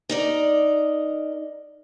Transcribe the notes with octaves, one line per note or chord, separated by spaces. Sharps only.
D#4 A#4 D5